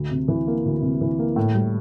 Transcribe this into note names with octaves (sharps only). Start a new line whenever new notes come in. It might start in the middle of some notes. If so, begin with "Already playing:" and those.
Already playing: D2
C3
E3
A#3
D2
C3
E3
A#3
A2
G3